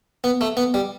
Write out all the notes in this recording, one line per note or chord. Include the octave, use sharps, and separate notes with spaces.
B3
A3
B3
G3